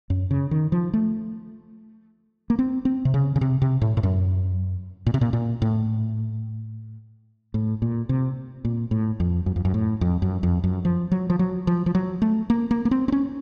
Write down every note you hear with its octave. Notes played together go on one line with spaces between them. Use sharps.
F#2
C#3
D#3
F3
A3
A#3
C4
C4
C3
C#3
C#3
C3
C3
A2
A2
F#2
A#2
C3
A#2
A#2
A2
A2
A#2
C3
A#2
A2
F2
F#2
F2
F#2
A2
F2
F#2
F2
F#2
F3
F#3
F3
F#3
F3
F3
F#3
A3
A#3
A#3
A#3
C4
C4
C#4